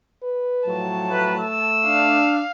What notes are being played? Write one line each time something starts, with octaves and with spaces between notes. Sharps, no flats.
B4
A2 F3 F#3 A5
A3 B4
E6
D4 F5